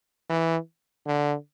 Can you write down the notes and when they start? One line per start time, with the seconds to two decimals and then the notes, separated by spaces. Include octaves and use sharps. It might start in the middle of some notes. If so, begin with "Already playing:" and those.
0.29 E3
1.07 D3